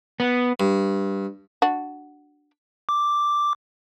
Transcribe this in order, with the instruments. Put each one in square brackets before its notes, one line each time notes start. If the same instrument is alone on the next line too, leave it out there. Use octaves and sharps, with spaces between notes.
[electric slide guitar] B3
[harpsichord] G2
[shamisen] D4 F#4
[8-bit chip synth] D6